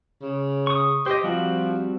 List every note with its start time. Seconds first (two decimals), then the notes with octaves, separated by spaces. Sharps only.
0.22 C#3
0.67 C#6 D#6
1.06 G4 C5 D#5
1.24 F3 G3 C4 F#4